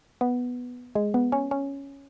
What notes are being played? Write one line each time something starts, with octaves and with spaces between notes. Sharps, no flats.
B3
G#3
B3
C#4
C#4